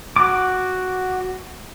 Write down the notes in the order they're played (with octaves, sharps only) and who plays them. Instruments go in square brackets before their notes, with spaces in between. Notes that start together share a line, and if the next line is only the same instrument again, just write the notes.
[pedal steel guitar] F#4 D6